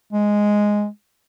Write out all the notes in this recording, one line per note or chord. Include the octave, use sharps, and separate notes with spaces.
G#3